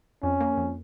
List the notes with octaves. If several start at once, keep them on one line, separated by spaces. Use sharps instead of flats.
F2 C#4
A#3
F2